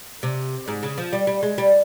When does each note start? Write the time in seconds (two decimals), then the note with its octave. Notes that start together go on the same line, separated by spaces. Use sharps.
0.23 C3
0.68 G#2
0.83 C#3
0.98 F3
1.13 G3
1.27 G3
1.43 G#3
1.58 G3